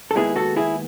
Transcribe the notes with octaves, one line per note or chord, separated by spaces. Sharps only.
A4
D#2 D#3 G#3 B3 E4 G#4
F#4 A4
E4 G#4